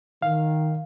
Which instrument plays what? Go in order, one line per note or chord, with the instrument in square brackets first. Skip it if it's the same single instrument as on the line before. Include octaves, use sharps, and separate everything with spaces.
[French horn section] D#3 [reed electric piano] F5